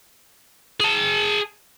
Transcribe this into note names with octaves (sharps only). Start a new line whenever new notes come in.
G#4 A5